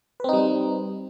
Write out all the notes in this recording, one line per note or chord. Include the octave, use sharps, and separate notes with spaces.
G3 C4 D#4 B4